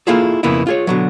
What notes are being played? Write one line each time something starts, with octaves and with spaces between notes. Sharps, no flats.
A#3 E4 F4 G#4 A4
F2 C#3 A#3 B3 E4
F4 G#4 C#5
B2 D3 F#3